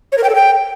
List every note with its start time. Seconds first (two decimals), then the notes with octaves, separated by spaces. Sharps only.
0.12 C#5
0.18 A#4
0.24 G5
0.29 A4
0.35 G5